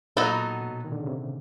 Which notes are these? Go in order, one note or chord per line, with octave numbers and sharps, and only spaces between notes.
A#2 F#3 B3 D#4 F#4 A4
B2
D#3
D3
C#3
C3